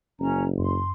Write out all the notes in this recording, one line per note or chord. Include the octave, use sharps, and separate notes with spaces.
F#1 C#4 A#5
F#2 C6